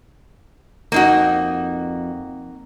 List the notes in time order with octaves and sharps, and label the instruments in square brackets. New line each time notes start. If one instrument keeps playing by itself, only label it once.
[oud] F2 [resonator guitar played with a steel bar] A#3 D#4 F#4